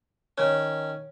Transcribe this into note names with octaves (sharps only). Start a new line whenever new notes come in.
D#3 C#4 C#5